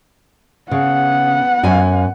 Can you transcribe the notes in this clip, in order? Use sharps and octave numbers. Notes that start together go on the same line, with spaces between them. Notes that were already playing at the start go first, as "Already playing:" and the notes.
C#3 B3 F#5
F#2 G#5